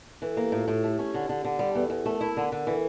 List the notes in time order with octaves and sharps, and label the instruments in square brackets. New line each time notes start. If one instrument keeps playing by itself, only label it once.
[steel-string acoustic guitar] E3 [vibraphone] A4
[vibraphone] A4
[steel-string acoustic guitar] A#3 [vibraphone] G4
[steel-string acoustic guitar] A2 [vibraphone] F4
[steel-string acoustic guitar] A2
[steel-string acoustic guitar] A3 [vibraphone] G4
[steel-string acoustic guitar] C#4
D3
D3
D3
G3
[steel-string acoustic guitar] E2 [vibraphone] A4
[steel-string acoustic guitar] E2
[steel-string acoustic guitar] A3 [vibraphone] A#4
[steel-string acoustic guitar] E4
D3
D3
[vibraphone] A#4
[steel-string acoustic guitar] E3 [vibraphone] A4